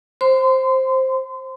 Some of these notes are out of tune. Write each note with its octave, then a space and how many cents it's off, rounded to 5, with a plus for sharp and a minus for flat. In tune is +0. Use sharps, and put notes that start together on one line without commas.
C5 +10 C6 -30